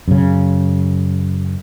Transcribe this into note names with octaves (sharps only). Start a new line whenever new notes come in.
F#2 C#3